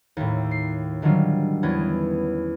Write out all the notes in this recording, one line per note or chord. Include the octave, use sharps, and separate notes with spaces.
D#2 A2
C7
D3 D#3 F#3 G3 F4
E2 B3 C#4